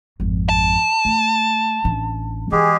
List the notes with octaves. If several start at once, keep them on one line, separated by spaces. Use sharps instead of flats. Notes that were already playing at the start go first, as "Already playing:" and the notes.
G#1 F2
A5
A3
A1 D4
E3 G#3 G4 G#4